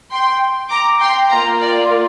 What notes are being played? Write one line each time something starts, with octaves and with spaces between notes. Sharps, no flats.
G5 C6
A#5 D6
G5 C6
A#3 F4 F5 A#5
D5